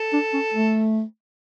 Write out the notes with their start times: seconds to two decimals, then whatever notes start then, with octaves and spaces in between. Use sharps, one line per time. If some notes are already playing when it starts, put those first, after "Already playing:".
Already playing: A4
0.13 D4
0.33 C#4
0.54 A3